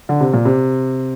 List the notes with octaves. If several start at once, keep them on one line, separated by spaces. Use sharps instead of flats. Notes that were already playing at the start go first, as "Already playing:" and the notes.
D3
C3
A#2
C3